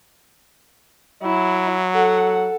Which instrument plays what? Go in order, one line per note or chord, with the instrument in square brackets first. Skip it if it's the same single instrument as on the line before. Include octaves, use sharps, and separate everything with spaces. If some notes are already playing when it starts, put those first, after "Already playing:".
[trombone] F#3 [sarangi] E4
[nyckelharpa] A4 [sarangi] F#5